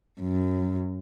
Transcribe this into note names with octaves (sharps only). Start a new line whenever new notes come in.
F#2